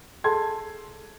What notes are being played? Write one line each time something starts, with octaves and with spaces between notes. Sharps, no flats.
G#4 A4 A5 C6 G#6